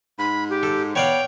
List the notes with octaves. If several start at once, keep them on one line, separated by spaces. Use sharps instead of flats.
G#2 B5
G4
A4
B3 C#5 D5 F5 G5